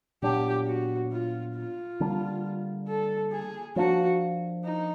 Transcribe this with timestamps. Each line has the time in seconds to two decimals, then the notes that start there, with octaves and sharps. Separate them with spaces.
0.22 A#2 F#3 B3 D4 G4
0.67 F#4
1.12 F4
1.55 F4
2.00 D3 G3 A#3 D4
2.89 A4
3.32 G#4
3.76 F3 A#3 D4 F#4
4.64 D#4